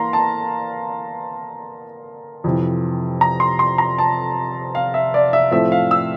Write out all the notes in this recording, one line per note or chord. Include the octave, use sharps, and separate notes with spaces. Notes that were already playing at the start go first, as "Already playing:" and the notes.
Already playing: E3 A#3 F5 A#5 C6
A5
F2 C3 E3
A#5
C6
C6
A#5
A5
F5
E5
D5
E5
A2 F3 A3 C4 E5
F5
E6